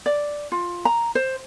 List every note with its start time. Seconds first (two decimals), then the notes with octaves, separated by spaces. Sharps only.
0.06 D5
0.52 F4
0.85 A#5
1.15 C5